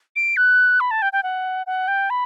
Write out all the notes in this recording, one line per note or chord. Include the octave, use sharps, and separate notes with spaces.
D7
F#6
B5
A5
G5
G5
F#5
F#5
G5
B5